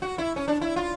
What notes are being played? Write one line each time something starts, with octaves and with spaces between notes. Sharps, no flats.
F#4
E4
C#4
D4
E4
F4